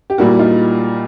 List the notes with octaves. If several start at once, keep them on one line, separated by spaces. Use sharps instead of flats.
G4
A#2 G3 A#3 E4 F#4
D#4 F4